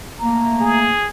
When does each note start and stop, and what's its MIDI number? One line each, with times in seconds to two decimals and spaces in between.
0.20 0.93 57
0.20 0.93 58
0.20 0.78 82
0.61 1.08 68